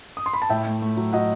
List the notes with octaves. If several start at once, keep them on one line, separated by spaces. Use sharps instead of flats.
D#6
C6
B5
A5
A2 E5 G5
A3
A3
F#3
F#3 D#5 F#5